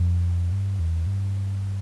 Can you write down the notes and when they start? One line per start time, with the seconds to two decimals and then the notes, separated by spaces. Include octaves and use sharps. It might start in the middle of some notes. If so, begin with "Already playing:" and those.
Already playing: F2
0.52 G2
0.79 E2
1.07 G2